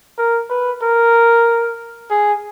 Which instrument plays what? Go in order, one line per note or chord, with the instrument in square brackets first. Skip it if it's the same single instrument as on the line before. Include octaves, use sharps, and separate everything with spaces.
[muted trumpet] A#4
B4
A#4
G#4